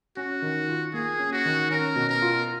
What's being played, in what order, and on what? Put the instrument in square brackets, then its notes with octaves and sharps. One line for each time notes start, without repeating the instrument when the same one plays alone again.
[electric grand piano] C#4 [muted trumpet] F#4
[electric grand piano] D#3
F4
[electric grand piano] A#3 [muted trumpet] G#4
[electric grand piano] C#4
[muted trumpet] F#4
[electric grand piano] D#3
[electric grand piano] C#4 [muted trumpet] A#4
[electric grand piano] B2
[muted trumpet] A#4
[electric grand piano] F4